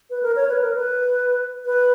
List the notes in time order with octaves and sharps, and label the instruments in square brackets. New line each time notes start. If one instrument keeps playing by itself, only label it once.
[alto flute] B4
A#4
C#5
B4
A#4
B4
B4